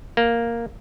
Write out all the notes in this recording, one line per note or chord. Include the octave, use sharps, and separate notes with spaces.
A#3